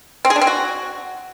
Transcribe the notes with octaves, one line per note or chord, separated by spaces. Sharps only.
C4
G#4
D4
C4
F#4